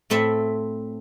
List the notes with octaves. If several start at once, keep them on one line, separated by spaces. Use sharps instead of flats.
A2 A3 C4 A4 E5